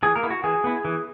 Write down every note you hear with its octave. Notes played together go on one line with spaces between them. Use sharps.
E3 G#4
A#3 A#4
B3 E4
F#4
E3 G#4
B3 E4
E3